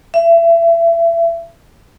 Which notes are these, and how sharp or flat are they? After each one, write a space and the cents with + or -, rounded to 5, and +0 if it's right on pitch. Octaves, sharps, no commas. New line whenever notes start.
E5 +30